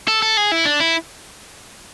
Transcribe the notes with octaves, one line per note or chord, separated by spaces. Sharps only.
A4
A4
G#4
E4
D4
E4